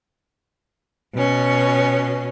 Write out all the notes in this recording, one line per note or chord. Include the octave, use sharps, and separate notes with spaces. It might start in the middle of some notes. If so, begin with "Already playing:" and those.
B2 C#4